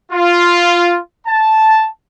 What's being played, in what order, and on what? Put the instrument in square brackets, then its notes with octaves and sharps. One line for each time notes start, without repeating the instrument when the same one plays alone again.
[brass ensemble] F4
A5